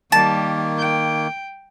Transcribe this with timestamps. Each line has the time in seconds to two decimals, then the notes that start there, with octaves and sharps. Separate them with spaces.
0.12 D#3 G3 A#3 G4 A5
0.78 G5